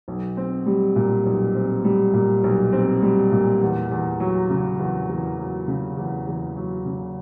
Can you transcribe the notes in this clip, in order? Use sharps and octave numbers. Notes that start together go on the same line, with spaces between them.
B1
C4
G3
A#2
B1
C4
G3
A#2
B1
C4
G3
A#2
E2
E2
F#3
C#3
E2
E2
F#3
C#3
E2
E2
F#3
C#3